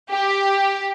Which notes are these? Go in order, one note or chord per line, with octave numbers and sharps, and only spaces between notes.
G4